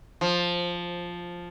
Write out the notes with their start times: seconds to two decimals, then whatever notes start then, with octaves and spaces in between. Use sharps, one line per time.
0.21 F3